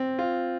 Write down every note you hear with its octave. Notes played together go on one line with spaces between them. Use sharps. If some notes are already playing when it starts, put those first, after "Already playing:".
Already playing: C4
F4